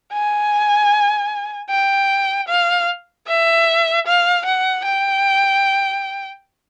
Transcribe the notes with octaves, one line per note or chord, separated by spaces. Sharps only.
G#5
G5
F5
E5
F5
F#5
G5